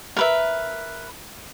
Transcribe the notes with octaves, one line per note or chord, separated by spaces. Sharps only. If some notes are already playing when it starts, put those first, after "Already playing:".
A#4 B4 E5